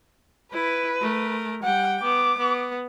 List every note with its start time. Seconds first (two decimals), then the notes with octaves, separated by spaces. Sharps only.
0.53 E4 B4
1.01 A3 A#4
1.63 G3 F#5 G5
2.03 B3 D6
2.37 B3